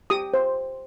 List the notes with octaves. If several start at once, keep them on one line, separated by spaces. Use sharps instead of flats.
G4 D#6
C5